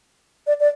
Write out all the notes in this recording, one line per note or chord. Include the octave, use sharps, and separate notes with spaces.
D5
D5